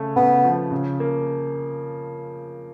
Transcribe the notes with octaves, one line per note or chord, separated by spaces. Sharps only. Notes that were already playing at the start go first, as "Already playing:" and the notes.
Already playing: C#3 A3
C#3 B3
F3
C#3
A#3